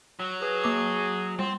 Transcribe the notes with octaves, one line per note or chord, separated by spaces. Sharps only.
F#3
G#4 B4
A#3 D6
G3 C4